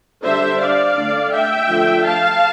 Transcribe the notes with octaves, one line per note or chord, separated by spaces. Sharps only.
D3 G3 D4 C5 E5
D5 F5
D3 A3 D4
E5 G5
D3 F3 A3 D4
F5 A5